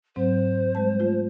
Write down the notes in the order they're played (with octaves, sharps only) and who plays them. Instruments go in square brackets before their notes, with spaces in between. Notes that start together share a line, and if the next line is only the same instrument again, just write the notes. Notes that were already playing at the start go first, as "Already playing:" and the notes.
[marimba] G#2 F#3 C4 [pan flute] C5
[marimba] G3 G#3 A5
A3 F4